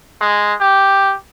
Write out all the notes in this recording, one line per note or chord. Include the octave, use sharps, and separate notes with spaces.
G#3
G4